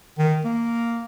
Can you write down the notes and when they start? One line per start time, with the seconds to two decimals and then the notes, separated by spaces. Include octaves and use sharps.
0.18 D#3
0.45 A#3